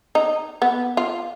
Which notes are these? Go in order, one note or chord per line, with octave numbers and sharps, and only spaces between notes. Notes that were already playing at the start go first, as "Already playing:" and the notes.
D#4
B3
F4